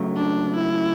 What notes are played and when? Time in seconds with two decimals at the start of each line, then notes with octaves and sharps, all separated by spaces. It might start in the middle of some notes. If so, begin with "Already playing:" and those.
Already playing: C#2 C#3 F#3 A3
0.16 D4
0.56 E4